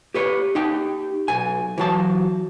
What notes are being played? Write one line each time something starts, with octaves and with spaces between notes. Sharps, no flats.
G4 B4 C#5
D#4 G4 G5
B1 G#5
E3 F#3 A5